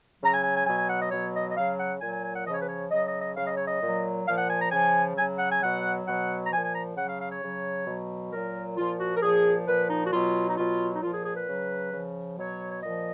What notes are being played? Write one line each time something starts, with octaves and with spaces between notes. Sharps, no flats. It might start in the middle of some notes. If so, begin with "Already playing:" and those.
C#3 F#3 A#5
G#5
G#5
G#5
B2 F#3 G#5
G#5
F#5
D#5
B2 F#3 C#5
D#5
D#5
C#3 F#3 F5
F#5
A#2 F#3 G#5
G#5
G#5
F#5
C#3 F3 D#5
C#5
B4
C#5
C#3 F#3 D#5
D#5
D#5
C#3 F#3 F5
D#5
C#5
D#5
A#2 F#3
A#2 F3 F5
F#5
G#5
A#5
C#3 F3 G#5
C#3 F#3 G#5
F#5
G#5
B2 F#3 F#5
B2 F#3 F#5
A#5
A#2 F3 G#5
G#5
A#5
C#3 F#5
F#3
F5
F5
C#5
C#3 F#3
B2 F#3
A#2 F#3 A#4
A#2 F3 F4
F#4
A#4
A#2 F3 G#4
A#2 F3 B4
D#4
F#4
B2 F#3 F4
D#4
B2 F#3 F4
D#4
A#2 F3 F4
G#4
G#4
B4
C#3 F#3
C#3 F3
B2 F#3 C#5
C#5
A#2 F3 D#5